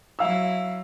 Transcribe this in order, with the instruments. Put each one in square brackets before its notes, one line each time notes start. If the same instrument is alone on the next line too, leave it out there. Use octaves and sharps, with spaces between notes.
[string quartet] F#3 E4 [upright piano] F5 E6